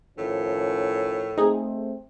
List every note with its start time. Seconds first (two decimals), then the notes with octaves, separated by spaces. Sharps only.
0.18 A2 D#3 F3 C#4
1.38 A3 C4 D#4 G#4